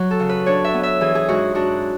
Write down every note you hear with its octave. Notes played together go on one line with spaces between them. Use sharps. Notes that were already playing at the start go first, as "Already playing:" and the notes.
Already playing: F#3
A4
C#3
B4
D4 C#5
E5
B3
E5
E3 G#4
G#4
G#2 F#4
D4 F#4